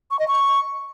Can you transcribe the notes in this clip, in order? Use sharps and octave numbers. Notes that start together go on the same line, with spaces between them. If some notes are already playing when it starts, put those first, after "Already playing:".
C#6
D#5
C#6